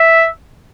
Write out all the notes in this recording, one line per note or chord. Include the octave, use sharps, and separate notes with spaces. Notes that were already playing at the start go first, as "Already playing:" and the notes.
Already playing: E5